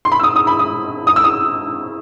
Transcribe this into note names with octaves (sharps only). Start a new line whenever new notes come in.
C6
B5
E6
D#6
D#6
B5
D#6
D#6
E6
D#6